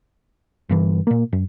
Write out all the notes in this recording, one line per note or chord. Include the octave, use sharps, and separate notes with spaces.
G1 G2 E3
A#2 A#3
F#2